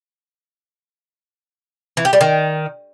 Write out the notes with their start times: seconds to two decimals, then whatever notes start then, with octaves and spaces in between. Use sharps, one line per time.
1.97 E3
2.05 G4
2.13 G3
2.21 D#3